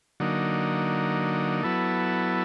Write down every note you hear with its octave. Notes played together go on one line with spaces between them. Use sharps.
D3 F#3 A#3 D#4
F#3 B3 E4 A4